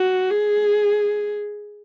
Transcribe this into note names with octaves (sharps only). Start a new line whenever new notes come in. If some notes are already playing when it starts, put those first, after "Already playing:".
Already playing: F#4
G#4